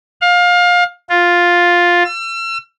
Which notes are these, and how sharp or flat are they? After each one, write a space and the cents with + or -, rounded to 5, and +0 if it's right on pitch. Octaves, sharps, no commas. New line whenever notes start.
F5 +25
F4 +5
E6 +40